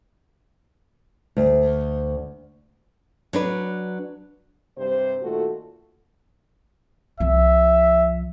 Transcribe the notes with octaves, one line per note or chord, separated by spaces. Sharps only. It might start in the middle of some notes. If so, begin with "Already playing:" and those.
D2
F#3 D4 B4
G2 C3 G3 C5
A#2 D#3 A3 F4 F#4 A4
C2 F3 E5